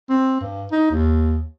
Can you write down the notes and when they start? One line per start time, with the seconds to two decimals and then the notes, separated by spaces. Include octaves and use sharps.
0.10 C4
0.41 G2
0.72 D#4
0.91 D#2